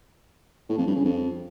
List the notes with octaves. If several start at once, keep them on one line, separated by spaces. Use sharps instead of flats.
A2
F2
G2
C#3
F2